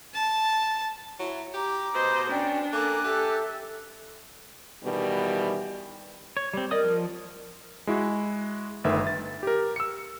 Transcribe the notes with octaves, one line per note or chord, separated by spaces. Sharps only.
A5
F#3 E4
G4 A#5 D6
B2 C5 D#5
C#4 D4 D5 G5
A#3 A4 G#5 D6 F#6
G4 A4 E5
B2 D#3 E3 G3
C#5
G3 C4
A#4 D5 D#5 D#6
F3
G#3 E4 F#4
G1 D#3 A3 B4 E5
A6
G4 A#4
E6 C#7